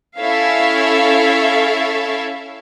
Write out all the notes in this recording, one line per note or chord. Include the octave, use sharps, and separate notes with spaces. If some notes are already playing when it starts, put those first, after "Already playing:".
C#4 E4 A4 C#5 E5 F5